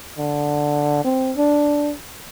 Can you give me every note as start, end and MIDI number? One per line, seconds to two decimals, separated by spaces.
0.18 1.01 50
1.04 1.32 60
1.37 1.93 62